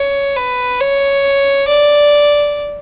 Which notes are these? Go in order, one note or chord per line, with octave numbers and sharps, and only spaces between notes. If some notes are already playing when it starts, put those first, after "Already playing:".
Already playing: C#5
B4
C#5
D5